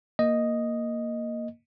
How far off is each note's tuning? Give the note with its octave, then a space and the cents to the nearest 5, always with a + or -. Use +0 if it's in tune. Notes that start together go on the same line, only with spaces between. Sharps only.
A#3 +0 D#5 +0